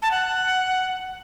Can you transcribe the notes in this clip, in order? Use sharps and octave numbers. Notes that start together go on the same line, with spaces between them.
A5
F#5